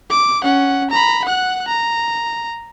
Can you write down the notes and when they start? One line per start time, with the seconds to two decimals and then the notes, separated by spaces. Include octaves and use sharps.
0.10 D6
0.43 C#4 F#5
0.91 A#5 B5
1.25 F#5 F#6
1.68 A#5